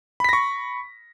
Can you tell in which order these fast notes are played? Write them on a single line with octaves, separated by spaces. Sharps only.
B5 B6 A#6 C#6